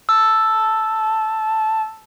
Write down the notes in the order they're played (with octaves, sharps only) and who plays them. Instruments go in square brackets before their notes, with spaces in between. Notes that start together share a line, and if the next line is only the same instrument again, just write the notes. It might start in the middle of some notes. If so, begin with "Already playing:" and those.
[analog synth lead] A5 [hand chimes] E6